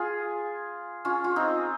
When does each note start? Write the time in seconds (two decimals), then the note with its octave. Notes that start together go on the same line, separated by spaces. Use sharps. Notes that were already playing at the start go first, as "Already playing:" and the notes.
Already playing: F4 G#4
1.05 C#4 F4
1.24 F4
1.36 C4 D#4